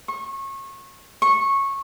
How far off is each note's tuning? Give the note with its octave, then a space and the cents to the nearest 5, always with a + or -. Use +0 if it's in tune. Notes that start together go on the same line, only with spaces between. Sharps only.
C#6 -30
C#6 -15